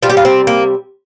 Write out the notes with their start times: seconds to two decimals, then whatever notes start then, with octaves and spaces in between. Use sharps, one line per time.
0.02 C3 G3 F4
0.09 G4
0.17 F4
0.25 C4
0.47 A#3